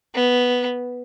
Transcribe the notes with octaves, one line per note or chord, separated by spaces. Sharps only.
B3